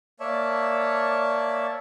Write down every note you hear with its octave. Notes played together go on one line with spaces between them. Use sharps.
A#3 C#5 D5 E5 A5